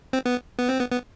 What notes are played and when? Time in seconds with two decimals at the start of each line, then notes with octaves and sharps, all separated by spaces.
0.13 C4
0.26 B3
0.59 B3
0.69 C4
0.79 B3
0.92 B3